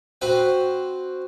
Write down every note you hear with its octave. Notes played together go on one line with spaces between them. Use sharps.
C4 F#4 B4 C5